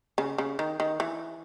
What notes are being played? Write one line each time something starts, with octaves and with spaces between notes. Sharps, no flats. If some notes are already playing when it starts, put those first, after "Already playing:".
C#3
C#3
D#3
D#3
E3